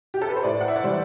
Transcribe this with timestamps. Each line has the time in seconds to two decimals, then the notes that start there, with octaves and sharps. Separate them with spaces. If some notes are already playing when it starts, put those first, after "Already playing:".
0.14 G4
0.22 A4
0.29 B4
0.36 C5
0.44 A2 D5
0.60 F#5
0.68 E5
0.76 D5
0.83 E3 G3 C5